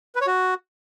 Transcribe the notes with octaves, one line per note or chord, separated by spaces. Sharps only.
B4
C#5
F#4